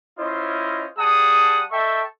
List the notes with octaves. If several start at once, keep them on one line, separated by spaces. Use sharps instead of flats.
C#4 E4 F4 C5 D#5
G3 G#4 F#5 A5 D#6
A4 D#5 E5 G5 A5 C#6